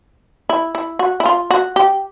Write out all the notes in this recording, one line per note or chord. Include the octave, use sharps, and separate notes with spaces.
E4
E4
F#4
E4
F4
F#4
G4